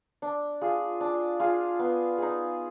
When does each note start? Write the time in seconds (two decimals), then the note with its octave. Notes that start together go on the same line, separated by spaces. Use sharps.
0.22 D4
0.61 F4 G#4
1.00 D4
1.40 F4 G#4
1.79 B3
2.18 D#4 G#4